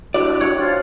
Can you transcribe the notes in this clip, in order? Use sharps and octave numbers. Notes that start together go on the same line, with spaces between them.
D4 E4 F#4 G4 D5
C#5
F3 D4 F4 F#4